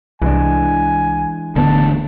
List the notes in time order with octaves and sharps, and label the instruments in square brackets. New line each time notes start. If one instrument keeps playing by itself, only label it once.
[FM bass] C2 [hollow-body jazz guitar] E3 G#3 D4 [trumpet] G#5
[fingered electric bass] D1 D2 B3 [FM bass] D3 [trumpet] A5